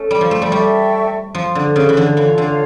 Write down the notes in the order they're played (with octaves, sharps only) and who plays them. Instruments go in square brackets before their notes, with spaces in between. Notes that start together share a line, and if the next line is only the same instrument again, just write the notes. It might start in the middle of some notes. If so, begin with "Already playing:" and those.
Already playing: [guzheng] A3 C#4
G3
F3
A3
G3
[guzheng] G3 [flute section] A4 E5 G5 C#6
[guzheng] F3
D3
C#3
E3
D3
[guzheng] E3 [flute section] F4 A4 C#5 F5
[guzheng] D3